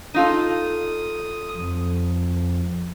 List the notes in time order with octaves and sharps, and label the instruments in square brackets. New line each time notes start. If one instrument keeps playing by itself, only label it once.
[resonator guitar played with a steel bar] D#4 F4 A4 [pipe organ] D#6
[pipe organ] F2